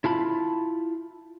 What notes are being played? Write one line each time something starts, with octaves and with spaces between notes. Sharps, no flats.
E4 F4 A5 B5